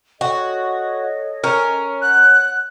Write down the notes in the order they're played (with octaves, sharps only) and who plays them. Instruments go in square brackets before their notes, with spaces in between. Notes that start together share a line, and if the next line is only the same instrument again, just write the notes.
[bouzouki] F#4 [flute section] A4 C#5 D#5
[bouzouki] C#4 A#4
[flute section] C#5 F#5 [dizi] F#6